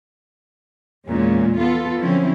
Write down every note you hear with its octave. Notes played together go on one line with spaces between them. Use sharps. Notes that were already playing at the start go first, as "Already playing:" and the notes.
E2 A#2 G#3 C#4
B3 F4 A4
D3 F3 F#3 C4 C#4 E4